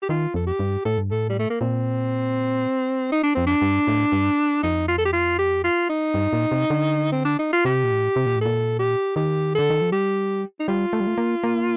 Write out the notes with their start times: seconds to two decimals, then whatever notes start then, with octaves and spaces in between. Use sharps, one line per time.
0.02 G4
0.09 D#3 F4
0.34 F2 A4
0.47 G4
0.59 G2
0.85 A2 A4
0.97 G2
1.11 A2 A4
1.29 G3
1.39 A3
1.50 A#3
1.61 A#2 C4
3.12 D#4
3.23 D4
3.35 F2 C4
3.47 D4
3.61 G2
3.87 A2
4.12 G2
4.63 F2 D#4
4.88 F4
4.98 A4
5.05 G4
5.13 F4
5.39 G4
5.64 F4
5.89 D#4
6.14 G2
6.33 A#2
6.51 C3
6.70 D3
7.12 C4
7.25 D4
7.39 D#4
7.53 F4
7.65 C3 G4
7.84 A#2
7.91 A2
8.16 C3
8.26 A#2
8.36 A2
8.41 A#2 A4
8.79 G4
9.16 D#3 G4
9.55 D3 A4
9.70 D#3
9.81 F3
9.92 G3 G4
10.60 D#4
10.68 G3 F4
10.93 A3
11.00 G3
11.07 A3
11.18 A#3
11.44 A#3